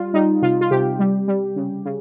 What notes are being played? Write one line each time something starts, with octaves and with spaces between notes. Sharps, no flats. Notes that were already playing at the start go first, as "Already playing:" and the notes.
Already playing: G3 F4
G3 D#4
C3 F4
F4
C3 G4
G3
G3
C#3
C#3